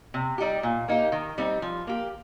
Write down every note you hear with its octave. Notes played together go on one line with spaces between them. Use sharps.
C3
G3 D#4 G4
A#2
A#3 D#4 G4
D#3
G3 C4 D#4
F3
A#3 G4